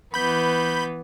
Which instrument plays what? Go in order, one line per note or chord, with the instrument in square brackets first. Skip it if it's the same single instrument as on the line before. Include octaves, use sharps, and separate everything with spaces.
[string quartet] E3 B3 [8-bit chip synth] B5 G6